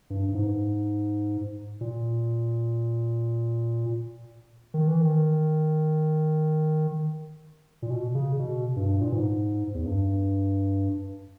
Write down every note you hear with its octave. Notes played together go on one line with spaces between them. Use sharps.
G2
G2
G#2
A#2
D#3
E3
D#3
A#2
B2
C#3
B2
G2
A#2
G#2
E2
G2